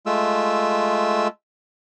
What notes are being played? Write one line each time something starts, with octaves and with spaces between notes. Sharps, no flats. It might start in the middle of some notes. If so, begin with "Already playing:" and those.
G#3 A3 F4 E6